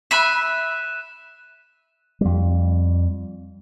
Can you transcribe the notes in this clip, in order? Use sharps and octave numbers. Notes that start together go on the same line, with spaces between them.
E5 B5 F#6 D#7 E7
F2 G3